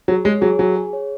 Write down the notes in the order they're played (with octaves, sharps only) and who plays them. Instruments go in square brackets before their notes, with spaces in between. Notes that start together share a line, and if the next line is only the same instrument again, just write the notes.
[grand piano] F#3 [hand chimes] G#4
[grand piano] G#3 [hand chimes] C#5
[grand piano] F#3 [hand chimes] G#4
[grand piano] F#3 [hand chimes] G#5
[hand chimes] G#4
C#5